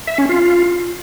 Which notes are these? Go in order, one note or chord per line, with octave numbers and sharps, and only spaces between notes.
E5
C#4
F4